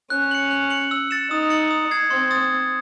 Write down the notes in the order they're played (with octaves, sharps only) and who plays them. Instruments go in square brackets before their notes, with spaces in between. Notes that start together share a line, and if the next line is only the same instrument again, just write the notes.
[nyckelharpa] C#4 [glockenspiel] F#6
[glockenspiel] C#7 F#7
F#6
C#7 F#7
E6
A6 C#7 E7
[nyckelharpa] D#4 [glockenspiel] D#6
[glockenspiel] A6 C#7 F#7
D#6
G#6 C7
[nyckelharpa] C4 [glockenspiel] C6
[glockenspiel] D#6 A6